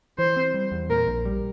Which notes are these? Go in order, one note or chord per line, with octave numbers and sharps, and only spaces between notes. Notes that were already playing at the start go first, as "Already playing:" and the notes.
E3 C5
C4
G3
E2
A#2 A#4
A#1
G3